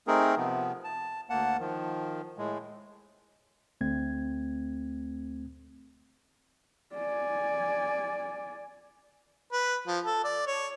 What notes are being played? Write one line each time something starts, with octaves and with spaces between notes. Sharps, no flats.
A3 C4 D#4 G#4 A#4
C3 F3 B3
A5
D2 A#3 F#5 A5
D#3 F3
A2 G#3
D2 A3 C4 G#6
D5 G#5
B4
F3
A4
D5
C#5